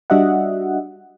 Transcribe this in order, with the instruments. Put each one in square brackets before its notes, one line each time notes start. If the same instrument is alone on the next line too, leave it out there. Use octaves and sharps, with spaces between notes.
[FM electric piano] G3 D4 F#4 D#5 E5 F#5